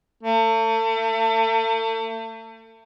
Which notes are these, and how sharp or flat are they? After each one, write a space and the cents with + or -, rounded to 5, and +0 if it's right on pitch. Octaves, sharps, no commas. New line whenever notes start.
A3 +40